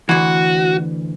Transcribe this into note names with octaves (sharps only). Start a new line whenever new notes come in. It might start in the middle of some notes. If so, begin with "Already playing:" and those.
D2 E3 F#4